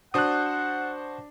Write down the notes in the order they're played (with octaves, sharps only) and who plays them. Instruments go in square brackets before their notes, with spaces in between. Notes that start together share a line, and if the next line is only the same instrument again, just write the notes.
[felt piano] D4 [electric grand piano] F#4 C5 A5 [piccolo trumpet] F#5 [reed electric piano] D#6 F#6